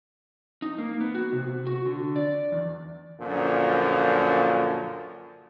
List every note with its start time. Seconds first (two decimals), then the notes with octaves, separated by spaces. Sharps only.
0.62 D#4
0.78 A#3
1.01 B3
1.14 F#4
1.32 C3
1.67 F#4
1.86 D3
2.16 D5
2.52 E2
3.20 F#2 A#2 D3 F3